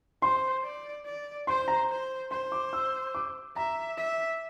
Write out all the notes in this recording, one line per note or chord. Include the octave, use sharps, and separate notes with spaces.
C5 C6
D5
D5
C5 C6
A#5
C5
C5 C6
D6
E6
D6
E5 A#5
E5